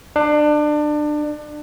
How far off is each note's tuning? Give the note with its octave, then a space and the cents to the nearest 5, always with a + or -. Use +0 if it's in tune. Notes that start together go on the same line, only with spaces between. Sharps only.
D4 +25